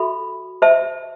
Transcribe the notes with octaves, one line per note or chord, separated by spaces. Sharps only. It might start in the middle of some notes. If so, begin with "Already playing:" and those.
Already playing: F#4 A4 E5 B5
C5 E5 A5